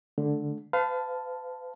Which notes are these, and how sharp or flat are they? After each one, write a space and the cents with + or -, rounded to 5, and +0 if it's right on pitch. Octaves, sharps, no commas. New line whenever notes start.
D3 +0 A3 -35
B4 +45 F5 +0 A5 +0